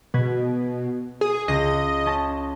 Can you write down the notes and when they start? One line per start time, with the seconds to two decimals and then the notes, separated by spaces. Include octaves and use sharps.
0.14 B2 B4 G#6
1.21 G#4
1.48 C#2 D#5
2.06 C#4 A5